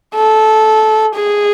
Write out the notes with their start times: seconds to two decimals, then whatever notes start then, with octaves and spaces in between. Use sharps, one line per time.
0.15 A4
1.16 G#4